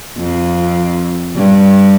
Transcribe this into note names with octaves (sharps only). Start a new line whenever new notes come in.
F2
G2